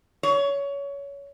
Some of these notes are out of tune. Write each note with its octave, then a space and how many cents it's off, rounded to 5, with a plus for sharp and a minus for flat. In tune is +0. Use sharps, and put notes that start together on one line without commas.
C#5 +20